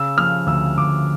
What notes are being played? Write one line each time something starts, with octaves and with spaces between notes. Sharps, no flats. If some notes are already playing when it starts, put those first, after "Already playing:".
Already playing: C#3 E6
F3 F6
D2 E6
D2 D6